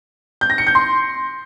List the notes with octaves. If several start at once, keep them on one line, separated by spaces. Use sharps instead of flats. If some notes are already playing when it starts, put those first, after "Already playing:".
G6
A#6
C#7
G6
C6